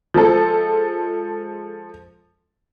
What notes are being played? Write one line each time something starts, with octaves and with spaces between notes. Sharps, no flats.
F3 G#3 A4